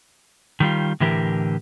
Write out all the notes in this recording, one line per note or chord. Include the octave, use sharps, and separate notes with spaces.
D#3 G3 F4
A2 D3 E3 G4 A#4